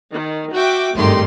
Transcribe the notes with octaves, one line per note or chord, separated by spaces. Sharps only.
D#3
F#4 E5 G5 D6
G#1 G2 D#3 A3 G4 C6